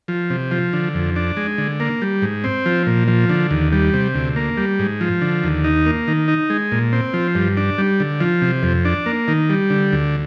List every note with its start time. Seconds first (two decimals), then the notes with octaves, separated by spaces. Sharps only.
0.08 F3
0.30 C3
0.51 F3
0.73 D3
0.95 F2
1.16 D4
1.37 G#3
1.58 D3
1.80 A#3
2.02 G3
2.22 G#2
2.44 C4
2.66 F3
2.87 A#2
3.08 F3
3.29 D3
3.51 D#2
3.72 G3
3.94 C3
4.15 D2
4.36 A#3
4.57 G3
4.79 G#2
5.01 F3
5.21 D3
5.44 D#2
5.64 D#4
5.86 A#3
6.08 D#3
6.28 D#4
6.50 G#3
6.72 A#2
6.93 C4
7.13 F3
7.35 G2
7.57 D4
7.78 G3
8.00 D3
8.20 F3
8.42 C3
8.63 F2
8.85 D4
9.06 A#3
9.28 D#3
9.50 G3
9.70 D3
9.92 D2